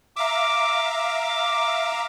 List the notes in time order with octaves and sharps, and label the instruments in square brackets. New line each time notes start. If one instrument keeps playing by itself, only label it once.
[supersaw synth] E5 F5 A#5 [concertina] D6